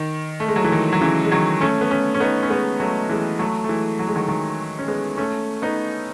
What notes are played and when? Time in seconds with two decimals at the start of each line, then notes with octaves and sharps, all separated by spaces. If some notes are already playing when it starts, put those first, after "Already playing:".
Already playing: D#3
0.40 A3
0.48 G#3
0.56 F#3
0.64 E3
0.72 D#3
0.93 F#3
1.01 C#3 E3
1.25 G#3
1.32 D#3 F#3
1.61 A3 C#4
1.81 B3
1.91 A3 C#4
2.15 C#4
2.20 B3 D#4
2.43 C#4
2.50 G#3 B3
2.80 F#3 A3
3.09 E3 G#3
3.39 F#3 A3
3.64 A3
3.69 E3 G#3
3.99 F#3
4.07 G#3
4.15 D#3 F#3
4.28 D#3 F#3
4.78 C#4
4.88 G#3 B3
5.17 A3 C#4
5.62 B3 D#4